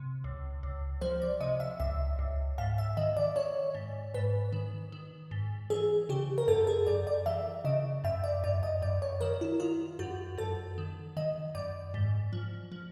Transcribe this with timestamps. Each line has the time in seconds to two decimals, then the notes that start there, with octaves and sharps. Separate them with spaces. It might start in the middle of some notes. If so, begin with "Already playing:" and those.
Already playing: C3
0.24 C#2
0.63 C#2
1.01 F3 C5
1.22 D5
1.40 C3 D#5
1.60 E5
1.80 C#2 E5
2.19 C#2
2.58 G#2 F5
2.78 E5
2.97 D#3 D#5
3.17 D5
3.36 D#3 C#5
3.75 G#2
4.14 G#2 B4
4.52 D#3
4.92 D#3
5.31 G#2
5.70 E3 G#4
6.09 C#3 G4
6.38 A#4
6.48 F#2 A4
6.67 G#4
6.87 F#2 D5
7.07 D5
7.26 E3 E5
7.65 C#3 D#5
8.04 F#2 E5
8.24 D5
8.44 F#2 D5
8.63 D#5
8.82 F#2 D5
9.02 C#5
9.21 D#3 A#4
9.41 E4
9.60 D#3 F4
9.99 F#2 F#4
10.38 F#2 A4
10.78 D#3
11.17 D#3 D#5
11.55 F#2 D5
11.94 G#2
12.33 F3
12.72 F3